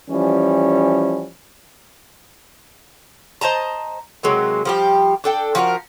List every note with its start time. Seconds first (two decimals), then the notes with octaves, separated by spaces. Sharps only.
0.10 E3 F3 G3 C#4
3.41 C5 D#5 A5 A#5
4.23 C3 F#3 G#3 A#3
4.65 F3 G3 G4
5.24 D4 A4 G5
5.55 F3 F#4 G#4 A#4